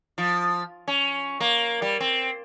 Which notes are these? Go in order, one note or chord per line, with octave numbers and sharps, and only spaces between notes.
F3
C#4
A#3
G3
C4